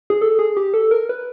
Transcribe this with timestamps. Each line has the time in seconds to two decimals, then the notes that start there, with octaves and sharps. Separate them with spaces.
0.10 G#4
0.21 A4
0.39 G#4
0.57 G4
0.74 A4
0.91 A#4
1.09 B4